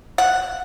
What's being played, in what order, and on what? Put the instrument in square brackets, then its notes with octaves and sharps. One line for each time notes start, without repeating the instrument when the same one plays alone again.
[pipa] F#5